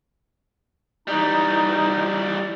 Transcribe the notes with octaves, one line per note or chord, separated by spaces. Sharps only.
E3 G3 D#4